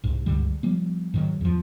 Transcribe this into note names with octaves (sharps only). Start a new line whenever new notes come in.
C2 G#2
C#2 G2 D3 G3
F3 G3 B3
G#2 D#3 F#3
E2 F3